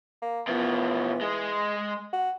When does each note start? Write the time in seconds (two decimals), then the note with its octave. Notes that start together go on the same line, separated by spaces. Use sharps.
0.22 A#3
0.47 B2 E3 F3
1.21 G#3 G#4
2.13 F#4